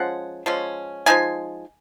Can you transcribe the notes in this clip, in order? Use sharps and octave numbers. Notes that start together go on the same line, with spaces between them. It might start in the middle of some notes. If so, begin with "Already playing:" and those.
Already playing: F3 G#3 C#4 F#5
F3 G#3 C#4
F3 G#3 D#4 G#5